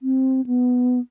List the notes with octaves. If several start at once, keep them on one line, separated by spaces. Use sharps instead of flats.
C4
B3